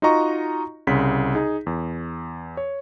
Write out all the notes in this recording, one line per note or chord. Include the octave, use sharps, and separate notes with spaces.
D#4 F4 F#4 D#5 A#5 C#6
C2 C#3 C6 B6
D#4 G#4
E2
C#5